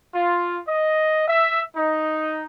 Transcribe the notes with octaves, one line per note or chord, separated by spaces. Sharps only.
F4
D#5
E5
D#4